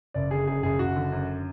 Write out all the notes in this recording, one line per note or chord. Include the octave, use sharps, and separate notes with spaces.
F#1 D5
D3 G#4
F#2 G#4
F#1 G#4
F#1 F#4
D3
F#2